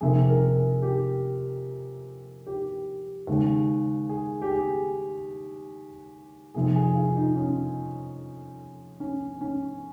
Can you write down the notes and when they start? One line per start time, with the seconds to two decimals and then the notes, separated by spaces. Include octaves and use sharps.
0.01 F2 C3 D#3 A#3 G#4
0.29 A#4
0.56 G#4
0.82 G4
2.47 G4
3.27 D#2 C#3 G#3
4.09 G#4
4.42 G4
4.51 G#4
6.54 F2 C3 D#3 G#4
6.76 G#4
6.95 F4
7.16 D#4
7.36 C#4
9.00 C#4
9.41 C#4